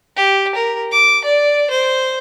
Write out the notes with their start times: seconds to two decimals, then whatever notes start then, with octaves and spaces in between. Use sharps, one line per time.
0.16 G4
0.55 A#4
0.92 D6
1.24 D5
1.70 C5